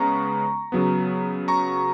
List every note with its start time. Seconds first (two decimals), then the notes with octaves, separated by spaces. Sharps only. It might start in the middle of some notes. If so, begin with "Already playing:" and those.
Already playing: C#3 G#3 B3 A#5 C#6
0.72 C#3 F#3 B3
1.48 A#5 C#6